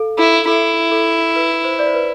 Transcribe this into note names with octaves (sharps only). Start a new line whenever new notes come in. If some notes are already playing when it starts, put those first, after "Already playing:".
Already playing: A4 F5
E4 A4
E4 A4
A4
B4
C5
D5
C5
B4